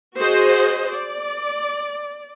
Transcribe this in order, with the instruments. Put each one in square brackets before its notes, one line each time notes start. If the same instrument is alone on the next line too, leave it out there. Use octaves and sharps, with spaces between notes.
[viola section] F#4 G#4 C5 D#5
D5